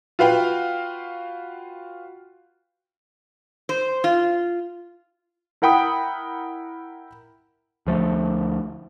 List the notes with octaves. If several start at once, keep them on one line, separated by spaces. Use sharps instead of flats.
F4 F#4 B4 F5 G5
C5
F4
E4 A#4 F#5 G5 B5 D#6
D2 F3 A3